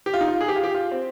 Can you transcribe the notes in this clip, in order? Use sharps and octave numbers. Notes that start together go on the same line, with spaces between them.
G4
F4
D#4
F4
G#4
G4
F4
G4
F4
C4